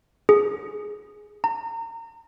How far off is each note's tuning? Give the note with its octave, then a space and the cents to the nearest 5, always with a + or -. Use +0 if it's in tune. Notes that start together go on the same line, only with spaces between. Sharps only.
G#4 +5
A#5 -30